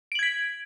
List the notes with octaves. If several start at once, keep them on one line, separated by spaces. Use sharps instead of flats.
G#6 B6 D7 F#7